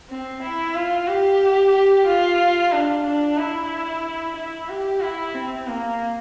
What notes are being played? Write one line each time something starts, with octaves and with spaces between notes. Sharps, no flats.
C4
E4
F4
G4
F4
D4
D4
E4
E4
G4
E4
C4
A#3